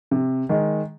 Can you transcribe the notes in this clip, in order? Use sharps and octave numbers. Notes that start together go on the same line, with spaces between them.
C3
D#3 G#3